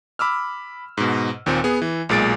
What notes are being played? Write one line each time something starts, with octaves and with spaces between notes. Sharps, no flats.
B5 D6 E6 F6
G#2 B2
D#2 A#2 C4
B3 G#4
E3
B1 A#2 G#3 A6 D7